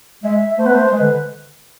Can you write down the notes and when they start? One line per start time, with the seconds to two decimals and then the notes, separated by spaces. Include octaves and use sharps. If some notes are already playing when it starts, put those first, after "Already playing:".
0.24 G#3 E5
0.58 A3 C5
0.65 B3 B4
0.74 A3 C5
0.92 G#3 C5
0.97 D3 B4